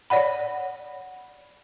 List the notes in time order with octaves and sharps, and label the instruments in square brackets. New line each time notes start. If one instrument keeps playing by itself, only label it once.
[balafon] C#5 D5 F#5 B5